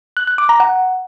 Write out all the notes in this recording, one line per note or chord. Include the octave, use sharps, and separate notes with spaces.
F#6
F#6
D6
A#5
F#5